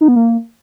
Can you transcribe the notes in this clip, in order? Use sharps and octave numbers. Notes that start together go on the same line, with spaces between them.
D#4
B3
A#3